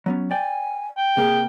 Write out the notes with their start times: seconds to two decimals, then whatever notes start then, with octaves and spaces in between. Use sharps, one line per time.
0.06 F#3 B3 C#4
0.31 D5 G5 G#5
0.97 G5
1.17 C3 A#3 G#4